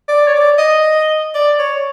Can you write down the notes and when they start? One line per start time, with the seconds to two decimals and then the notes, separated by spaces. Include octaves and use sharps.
0.08 D5
0.27 C#5
0.34 D5
0.58 D#5
1.35 D5
1.59 C#5